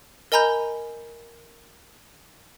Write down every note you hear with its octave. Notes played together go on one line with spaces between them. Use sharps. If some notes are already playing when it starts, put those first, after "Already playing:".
A#4 D#5 G#5 A#5 B5 G6